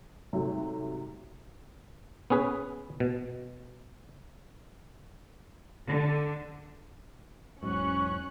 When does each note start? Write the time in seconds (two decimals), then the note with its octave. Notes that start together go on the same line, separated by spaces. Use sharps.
0.33 G#2 C3 F#3 G3 A3
2.30 B3 C#4 G#4 B4
3.00 B2
5.88 D3
7.63 E1 G#2 F#3 C#4 C#6 F#6